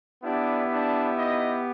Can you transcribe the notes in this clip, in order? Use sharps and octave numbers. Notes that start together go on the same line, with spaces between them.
B3 D4 E4 G4 D5
D4 D5
D#4 D#5